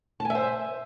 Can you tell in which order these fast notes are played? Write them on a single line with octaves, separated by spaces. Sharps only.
A5 G#5 E5 C5